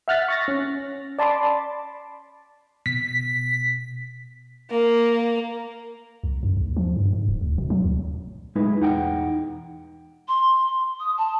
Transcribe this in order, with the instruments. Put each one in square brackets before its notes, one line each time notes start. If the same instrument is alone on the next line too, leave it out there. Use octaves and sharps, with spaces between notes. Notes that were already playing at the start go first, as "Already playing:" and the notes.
[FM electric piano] E5 F#5 F6 F#6 A6 B6
C#6 A6 A#6
C#4
D5 A5 B5 C6 D6
[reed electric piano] B2 [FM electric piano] B6
[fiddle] A#3
[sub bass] C2
F#2
D#2
F3
G2
G#2
D1
D2
B2
F#3
D2
[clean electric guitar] B1 A2 G#3 D#4 E4 B4
E2 D#4 F#5 G5
[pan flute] C6
D#6
A5